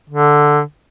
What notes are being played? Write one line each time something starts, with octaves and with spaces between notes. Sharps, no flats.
D3